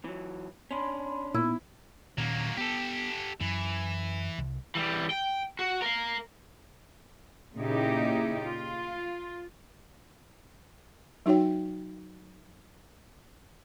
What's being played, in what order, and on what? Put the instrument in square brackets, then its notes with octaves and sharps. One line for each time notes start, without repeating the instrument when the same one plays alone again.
[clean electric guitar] E3 F#3
[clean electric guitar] C#4 D4 [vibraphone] B5 C6
[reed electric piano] A#2 [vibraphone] B3 D#4 [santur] E4
[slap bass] A#2 D#3 C#4 [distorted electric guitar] F#3 A#3
[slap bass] B3 [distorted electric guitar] G4 A4
[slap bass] F#2 [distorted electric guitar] E3
[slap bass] C2
[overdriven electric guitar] E3 G3
G5
F#4
A#4 F5
[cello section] A#2 C#3 D#4 E4 G4
F4
[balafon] F#3 D#4 F#4 C#5 G5